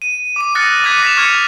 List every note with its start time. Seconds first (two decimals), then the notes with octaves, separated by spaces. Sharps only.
0.02 D#7
0.36 D6 D#7
0.55 D#6 F6 F#6 A6 A#6 C#7
0.84 D6 F#6 G#6 B6 D#7
1.02 A#6 B6 E7 F7
1.17 C#6 F6 G#6 C#7